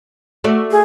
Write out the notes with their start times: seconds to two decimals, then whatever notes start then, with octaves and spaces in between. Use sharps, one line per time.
0.44 A3 F#4 D5
0.71 G#4